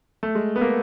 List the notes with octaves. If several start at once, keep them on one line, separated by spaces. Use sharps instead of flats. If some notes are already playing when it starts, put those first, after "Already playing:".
A3
G#3
B3
A#3